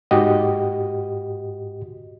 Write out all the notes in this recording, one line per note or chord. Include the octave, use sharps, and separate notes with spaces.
G#2 F#4 G4 D#5